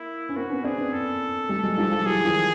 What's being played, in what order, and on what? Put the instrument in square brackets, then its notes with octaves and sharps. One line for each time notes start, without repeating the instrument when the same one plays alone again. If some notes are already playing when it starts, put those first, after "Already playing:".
Already playing: [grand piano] A#3 [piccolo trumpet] E4
[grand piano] C#4
[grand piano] A#3 C4 [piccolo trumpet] F#4
[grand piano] B3 C#4
[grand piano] C4 D4 [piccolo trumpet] G#4
[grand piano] B3 C#4
[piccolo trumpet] A4
[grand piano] G3 A3
F#3 G#3
F3 G3
F3 G3
[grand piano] E3 F#3 [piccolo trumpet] G#4
[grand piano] D#3 F3